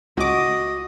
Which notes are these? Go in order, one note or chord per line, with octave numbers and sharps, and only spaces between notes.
C#2 F#4 D#5 D6